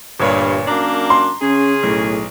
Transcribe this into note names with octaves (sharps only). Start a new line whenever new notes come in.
G1 G2 A#2 C#5
F#2 A#3 D4 A#5
C6
C#3 C#4 G#4
B1 A2